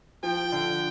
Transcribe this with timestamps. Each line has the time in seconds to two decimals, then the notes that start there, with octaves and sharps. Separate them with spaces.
0.23 F3 G5
0.52 D3